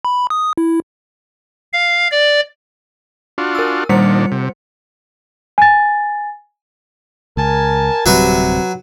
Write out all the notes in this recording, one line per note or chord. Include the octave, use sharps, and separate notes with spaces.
B5
D#6
E4
F5
D5
D4 F4 F#4
A#4 E6
A#2 D#3 G3 D4 C5 C#7
C3
G#5 A6
C#2 A#4 G#5 A5
D1 C3 F#3 G3 F#4 B4